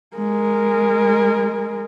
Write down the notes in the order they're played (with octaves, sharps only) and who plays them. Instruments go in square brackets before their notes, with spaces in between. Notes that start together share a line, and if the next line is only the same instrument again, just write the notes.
[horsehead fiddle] G#3 A#4